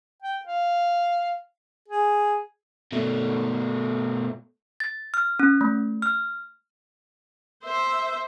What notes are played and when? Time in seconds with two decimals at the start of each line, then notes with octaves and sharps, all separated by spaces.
0.23 G5
0.45 F5
1.89 G#4
2.92 B2 A3
4.80 A6
5.14 F6
5.40 C#4
5.61 A3
6.02 F6
7.64 C5 E5